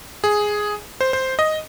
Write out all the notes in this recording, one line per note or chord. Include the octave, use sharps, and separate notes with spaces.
G#4
C5
C5
D#5